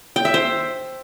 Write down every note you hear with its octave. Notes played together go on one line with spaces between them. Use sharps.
G5
E5
C5